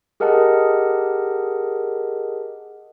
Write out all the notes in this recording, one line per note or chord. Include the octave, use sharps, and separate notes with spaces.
G4 G#4 A#4 D#5 F#5 A5